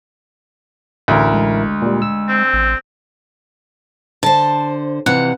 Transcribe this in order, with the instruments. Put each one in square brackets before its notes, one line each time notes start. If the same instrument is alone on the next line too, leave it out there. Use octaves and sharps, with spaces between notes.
[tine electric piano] A1 E4 A#4 [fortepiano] D2
[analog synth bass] G#3
[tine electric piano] A#2 G3
E6
[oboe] C4
[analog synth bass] A1
[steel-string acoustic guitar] D3 C5 [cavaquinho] A5
[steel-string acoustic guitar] F2 C3 E3 [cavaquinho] F#5